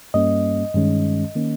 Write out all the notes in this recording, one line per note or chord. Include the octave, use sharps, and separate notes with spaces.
G2 G3 A#3 C#4 D#5
G2 D#3 G#3 C#4
D#3 A#3 C#4